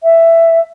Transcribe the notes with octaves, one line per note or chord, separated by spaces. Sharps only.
E5